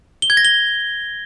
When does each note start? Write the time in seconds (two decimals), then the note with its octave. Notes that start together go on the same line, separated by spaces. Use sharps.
0.22 G7
0.30 G#6
0.37 A#6
0.45 G7